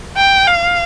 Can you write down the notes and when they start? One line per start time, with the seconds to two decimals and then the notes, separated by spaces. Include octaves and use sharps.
0.17 G5
0.47 F5